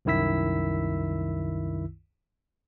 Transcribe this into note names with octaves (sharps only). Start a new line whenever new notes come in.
C2 F#2 D#3 E4 E6 B6